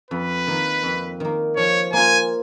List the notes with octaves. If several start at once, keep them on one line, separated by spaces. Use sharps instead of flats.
F2 B4
D#3 A#3
F2
D#3 A#3
F3 C#5
A#3 F4 G#5